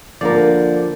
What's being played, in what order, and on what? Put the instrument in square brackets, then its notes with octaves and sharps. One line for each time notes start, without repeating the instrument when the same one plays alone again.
[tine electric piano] D3 A#3 D5 [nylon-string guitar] F3 A#4